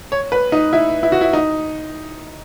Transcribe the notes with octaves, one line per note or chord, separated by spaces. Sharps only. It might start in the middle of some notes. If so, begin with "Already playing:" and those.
C#5
B4
D#4
E4
E4
F#4
E4
D#4